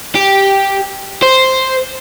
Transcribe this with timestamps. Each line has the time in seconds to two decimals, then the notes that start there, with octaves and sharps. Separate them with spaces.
0.15 G4
1.22 C5